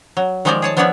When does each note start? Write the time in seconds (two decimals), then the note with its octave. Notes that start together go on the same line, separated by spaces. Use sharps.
0.17 F#3
0.45 D#3 F3 G#3 G4 A#4 D5
0.62 G#4 C#5 A5
0.77 F3 B3 D4 C#5 D5 E5